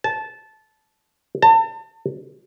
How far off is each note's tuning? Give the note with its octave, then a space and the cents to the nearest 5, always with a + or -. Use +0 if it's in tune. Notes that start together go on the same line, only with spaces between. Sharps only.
A5 -15
A5 +35